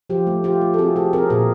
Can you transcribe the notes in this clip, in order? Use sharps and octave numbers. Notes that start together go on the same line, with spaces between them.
F3 F4 G4
A3
A3 F4 G4
A3
A4
C4 F#4 G#4
A3 G4 A4
C4 G#4 A#4
A#2 G#4 A#4